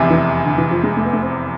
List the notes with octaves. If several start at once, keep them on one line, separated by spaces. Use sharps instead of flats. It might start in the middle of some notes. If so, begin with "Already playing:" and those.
Already playing: F1 E2 C3
E3
D3
E3
F3
G#3
A3
B3
A3
C4